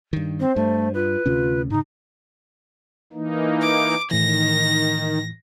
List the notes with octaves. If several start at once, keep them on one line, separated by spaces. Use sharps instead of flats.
G2 D#3
C4 C5
G2 A3
F4 B4
D2 C3 C#4 F4
G#2 C#3 D#4
E3 A#3 D#4
D6
A2 D#3 E3 A#6